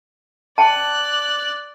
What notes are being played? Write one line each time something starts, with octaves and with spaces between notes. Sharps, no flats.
D5 G5 A5 F#6